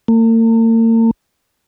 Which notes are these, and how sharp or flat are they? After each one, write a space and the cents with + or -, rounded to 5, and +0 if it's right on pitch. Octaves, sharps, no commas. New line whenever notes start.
A#3 -45